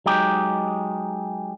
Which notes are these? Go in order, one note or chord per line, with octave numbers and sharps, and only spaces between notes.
F#3 G#3 D#4 G4